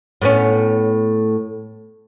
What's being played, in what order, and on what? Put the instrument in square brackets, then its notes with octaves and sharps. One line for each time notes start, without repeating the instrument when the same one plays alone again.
[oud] A2 B3 C#4